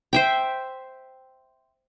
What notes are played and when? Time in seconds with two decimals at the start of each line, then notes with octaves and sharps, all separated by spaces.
0.13 C5 E5 G5